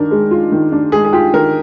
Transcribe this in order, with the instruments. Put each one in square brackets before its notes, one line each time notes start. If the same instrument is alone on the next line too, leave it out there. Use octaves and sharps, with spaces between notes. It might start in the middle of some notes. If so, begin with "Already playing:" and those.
Already playing: [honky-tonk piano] D#3 D4 [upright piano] A#4
[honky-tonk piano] G#3
F4
D#3
D4
[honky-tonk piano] G#3 [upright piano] G#4
[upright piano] G#4
[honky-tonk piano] F4 [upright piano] G4
[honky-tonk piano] D#3 [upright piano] A#4